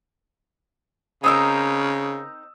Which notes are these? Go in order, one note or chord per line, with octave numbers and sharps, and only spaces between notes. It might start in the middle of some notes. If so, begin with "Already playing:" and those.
C#3 C4 D#4 A#4 D#6 E6